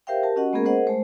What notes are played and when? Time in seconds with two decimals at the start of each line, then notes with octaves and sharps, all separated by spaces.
0.07 G4 A#4 C5 E5 F5 G5
0.23 G4 A#4 A5
0.36 C#4 F#4 D#5 F#5
0.53 G#3 A#3 B3 C#4 G#4 A#4
0.65 G#4 A#4 C5 D#5 F#5
0.87 G#3 A3 C5